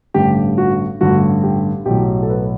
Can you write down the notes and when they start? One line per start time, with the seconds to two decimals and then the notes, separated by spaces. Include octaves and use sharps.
0.14 A1 G2 D3 G4
0.58 F#4
1.01 A1 G2 D3 F#4
1.43 G4
1.86 B1 A2 F#3 G4
2.22 A4
2.29 B4